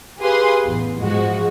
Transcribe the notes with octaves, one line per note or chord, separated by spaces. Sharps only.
G4 G#4 B4 F5 C6 D#6
A1 E2
G#2 F3 G#3 F#4